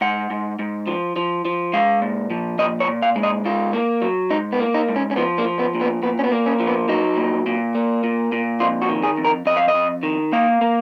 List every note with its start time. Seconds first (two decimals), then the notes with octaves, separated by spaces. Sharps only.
0.01 G#2 F#5
0.30 G#2
0.59 G#2
0.87 F3
1.16 F3
1.45 F3
1.73 G#3 F5
2.02 A#2
2.30 F3
2.58 A#2 D#5
2.80 C#5
2.88 A#2
3.02 F5
3.16 G#3
3.23 D#5
3.45 G#2 F4
3.73 A#3
4.02 F#3
4.30 G#2 D#4
4.52 B3
4.60 A#3
4.74 D#4
4.89 G#2
4.96 C#4
5.11 C#4
5.16 F3 B3
5.38 A#3
5.45 F3
5.59 B3
5.75 A#2
5.81 B3
6.03 A#2 B3
6.19 C#4
6.24 B3
6.32 A#3
6.46 C#4
6.60 F3
6.67 B3
6.88 F#3 D#4
7.17 A#2
7.46 A#2
7.75 A#3
8.04 A#2
8.32 A#2
8.60 F2 F4
8.82 F#4
8.89 D#3
9.03 G#4
9.17 F2
9.25 A#4
9.46 F2 D#5
9.57 F5
9.68 D#5
9.74 F2
10.03 D#3
10.32 A#3 F5
10.61 A#3